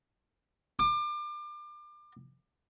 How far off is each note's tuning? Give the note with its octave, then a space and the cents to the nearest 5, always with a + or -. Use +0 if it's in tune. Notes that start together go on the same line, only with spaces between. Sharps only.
D6 +30